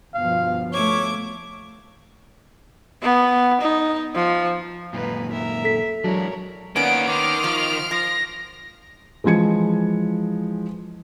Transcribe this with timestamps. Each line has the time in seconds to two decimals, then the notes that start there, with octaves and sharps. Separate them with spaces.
0.14 G1 B2 F3 F5
0.72 A3 C#5 D6 G#6
3.02 B3
3.61 D#4
4.15 F3
4.93 F#2 A#2 D#3 D#4 B4
5.31 A#4 E5
5.64 A4 B6
6.04 E3 F#3 G#3 D4 A#4 C#5
6.76 D#3 A#3 B3 C#4 D5 F5 F#5 D7
7.07 D#3 C6 D6 F6 D7
7.44 F3
7.91 F3 A#6
9.24 E3 F3 G#3 G#6 C#7